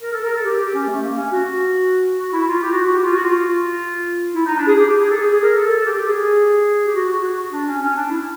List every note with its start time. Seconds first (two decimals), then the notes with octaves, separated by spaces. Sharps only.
0.01 A#4
0.12 A4
0.23 A#4
0.34 A4
0.45 G4
0.60 G4
0.73 C#4
0.88 A3
1.02 A#3
1.17 C#4
1.31 F#4
2.18 F#4
2.32 E4
2.47 F4
2.61 G4
2.72 F#4
2.83 F#4
2.93 G4
3.04 F4
3.15 F#4
3.24 F4
4.34 E4
4.45 D#4
4.56 D4
4.66 G#4
4.78 G4
4.88 G4
5.00 G#4
5.10 A4
5.21 G#4
5.32 G#4
5.42 A#4
5.54 A4
5.64 A4
5.75 A4
5.86 G4
5.96 G4
6.08 G#4
6.86 G4
6.94 F#4
7.09 F#4
7.23 F#4
7.52 D4
7.66 C#4
7.81 C#4
7.95 D4
8.10 E4